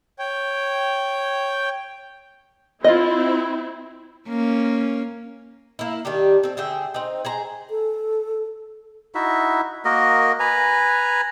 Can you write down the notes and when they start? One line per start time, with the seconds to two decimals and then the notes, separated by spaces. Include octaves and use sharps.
0.19 C#5 G5
2.84 C4 E4 F4 D#5
4.28 A#3 C#4
5.79 A#3 E4
6.05 D#3 G3 D4 G4
6.43 C4 A4
6.57 D3 G#4 E5 G5
6.94 C4 D#4
7.25 G#4 C5 A#5
7.70 A4
9.15 D#4 E4 F#4 E5
9.85 A#3 F#4 A#4 D#5
10.40 B4 G#5 A#5